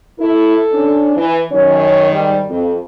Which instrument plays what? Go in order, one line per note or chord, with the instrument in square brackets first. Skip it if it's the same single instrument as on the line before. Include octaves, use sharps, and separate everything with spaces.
[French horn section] E4 [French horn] A4
[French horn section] C#4 D4
E3
[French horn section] F#2 C#4 C#5 [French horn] D#3
[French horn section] G#2 G3
F2